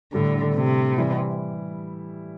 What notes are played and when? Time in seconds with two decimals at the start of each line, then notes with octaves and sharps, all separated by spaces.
0.13 A2 D3 G3 D4
0.55 C3
0.98 E3 G3 E4